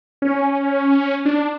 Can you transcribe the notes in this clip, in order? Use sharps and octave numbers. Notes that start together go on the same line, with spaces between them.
C#4
D4